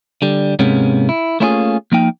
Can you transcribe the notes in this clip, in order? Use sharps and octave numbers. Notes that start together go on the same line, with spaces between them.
D3 G3
G#2 C3 G#3 A#3 B3 C#4
E4
A3 A#3 C#4 E4 F4 G#4
F3 A#3 D#4 G5